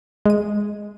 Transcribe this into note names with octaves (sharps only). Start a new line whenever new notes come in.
G#3 D#7